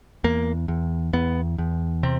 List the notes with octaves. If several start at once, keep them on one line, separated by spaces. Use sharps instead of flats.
E2 A#3
E2
E2 B3
E2
C3 C4